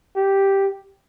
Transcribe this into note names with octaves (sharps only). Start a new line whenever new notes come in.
G4